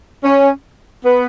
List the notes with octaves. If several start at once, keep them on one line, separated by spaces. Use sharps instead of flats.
C#4
B3